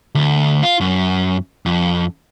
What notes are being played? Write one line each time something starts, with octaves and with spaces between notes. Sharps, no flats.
D2
F4
F#2
F2